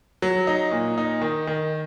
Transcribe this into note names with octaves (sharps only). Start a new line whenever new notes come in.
F#3
D#4
A#2
D#4
D#3
D#3